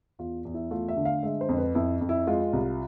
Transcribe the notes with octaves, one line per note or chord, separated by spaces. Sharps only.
E2 F4
E2
E4
A3 F4
E5
D3
F5
G#3 E5
C5
F2
B4
F2 E4
F2
E4
G#3 F4
C2